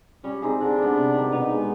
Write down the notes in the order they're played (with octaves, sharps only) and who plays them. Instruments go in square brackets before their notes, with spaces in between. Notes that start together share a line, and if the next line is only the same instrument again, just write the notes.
[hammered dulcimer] G3 [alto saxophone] C#4
[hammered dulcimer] C4 D#4 G#4
[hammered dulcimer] D3 [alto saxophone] D4
[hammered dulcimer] G3 B3
C3
D#3 G3
[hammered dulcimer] B2 [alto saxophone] D#4
[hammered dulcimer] G#3 B3